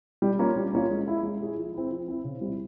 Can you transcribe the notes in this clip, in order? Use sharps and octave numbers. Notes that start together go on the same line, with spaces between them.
G3
A#3 C#4 F4
G3
A#3 C#4 F4
G#3
E4 G#4
G#3
E4 G#4
F3
C4 E4
F3
C4 E4
C#3
G3 C4 E4